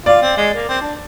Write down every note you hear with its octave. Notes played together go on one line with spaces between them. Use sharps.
F4 D5
C4
G#3
A#3
C4
D4